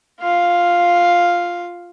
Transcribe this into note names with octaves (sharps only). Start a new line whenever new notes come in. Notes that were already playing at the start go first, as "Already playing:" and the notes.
F4 F5